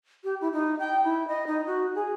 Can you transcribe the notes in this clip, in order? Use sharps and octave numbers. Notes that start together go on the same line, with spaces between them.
G4
E4
D#4
G5
E4
D#5
D#4
F#4
G#4